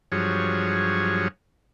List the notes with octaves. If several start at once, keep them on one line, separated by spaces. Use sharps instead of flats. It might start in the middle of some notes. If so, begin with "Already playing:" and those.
G2 F3 F#3 G#4 C#5